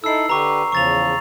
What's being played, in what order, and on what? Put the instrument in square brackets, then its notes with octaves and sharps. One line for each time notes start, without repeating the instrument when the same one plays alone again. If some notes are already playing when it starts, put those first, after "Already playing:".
[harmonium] D#4 E4 A4 [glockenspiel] E6 C7
[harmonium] D3 G4 B4 [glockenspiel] A#5 C#6
[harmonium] E2 C#3 F3 [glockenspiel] C#6 A6 F7